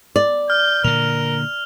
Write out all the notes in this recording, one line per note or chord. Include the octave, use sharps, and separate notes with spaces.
D5
F6 G6
A#2 D3 A#4 F7